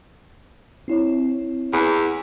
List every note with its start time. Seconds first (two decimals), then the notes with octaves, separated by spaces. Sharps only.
0.88 C4 E4 C#5
1.73 E2